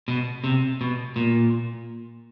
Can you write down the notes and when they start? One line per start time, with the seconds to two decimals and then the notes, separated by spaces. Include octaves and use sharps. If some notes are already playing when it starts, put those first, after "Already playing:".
0.08 B2
0.44 C3
0.81 B2
1.16 A#2